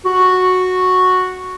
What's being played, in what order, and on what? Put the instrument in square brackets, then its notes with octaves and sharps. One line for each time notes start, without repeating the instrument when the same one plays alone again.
[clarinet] F#4